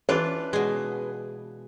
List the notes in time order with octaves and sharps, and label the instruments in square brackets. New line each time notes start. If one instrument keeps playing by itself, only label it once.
[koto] E3 D4 F4 [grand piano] C#4 B4
[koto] B2 G#3